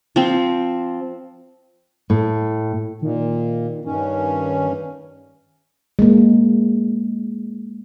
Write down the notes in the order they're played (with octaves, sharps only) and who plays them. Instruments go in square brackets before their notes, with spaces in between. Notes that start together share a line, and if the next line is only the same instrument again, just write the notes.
[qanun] F3 C4
[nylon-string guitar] A2
[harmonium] A#2 [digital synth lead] D#3
[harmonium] G2 C#4 [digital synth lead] D#3
[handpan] G#3 A#3